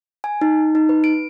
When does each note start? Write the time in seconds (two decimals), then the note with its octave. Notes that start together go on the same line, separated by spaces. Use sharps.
0.24 G#5
0.41 D#4
0.75 D#4
0.89 B4
1.04 D7